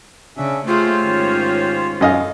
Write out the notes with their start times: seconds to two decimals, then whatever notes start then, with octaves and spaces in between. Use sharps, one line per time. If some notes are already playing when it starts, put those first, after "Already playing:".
0.37 C#3 C#4 D4 E5
0.67 A3 F4 G4 G#4 C5 C#5
1.03 G#2 D#3 C#4
2.01 F#2 D#5 F5